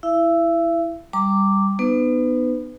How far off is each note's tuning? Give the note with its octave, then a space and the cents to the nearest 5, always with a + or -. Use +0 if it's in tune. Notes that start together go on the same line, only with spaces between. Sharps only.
E4 +0 E5 +40
G3 +0 A#5 -25 D6 +0
B3 +0 D#4 -30 B4 +35